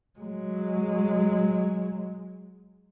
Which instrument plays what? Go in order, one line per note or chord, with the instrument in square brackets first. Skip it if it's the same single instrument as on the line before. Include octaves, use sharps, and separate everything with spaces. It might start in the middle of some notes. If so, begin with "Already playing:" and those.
[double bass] F#3 G#3